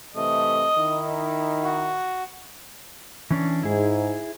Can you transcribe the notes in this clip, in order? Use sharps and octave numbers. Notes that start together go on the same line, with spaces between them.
C3 E3 A3 D#5
D#3 D#4 E4
F#4
E3 C#4 D4
G#2 E4 G#4